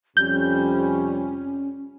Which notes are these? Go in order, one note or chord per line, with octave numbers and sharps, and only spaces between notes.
F2 C3 G3 C#4 G6